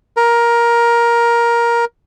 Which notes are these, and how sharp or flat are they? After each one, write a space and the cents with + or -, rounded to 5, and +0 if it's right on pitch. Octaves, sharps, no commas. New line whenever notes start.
A#4 +15